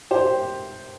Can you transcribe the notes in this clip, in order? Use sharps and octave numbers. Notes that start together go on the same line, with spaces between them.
G4 C5